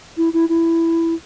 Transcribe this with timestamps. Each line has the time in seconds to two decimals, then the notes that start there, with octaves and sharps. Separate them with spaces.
0.18 E4
0.33 E4
0.49 E4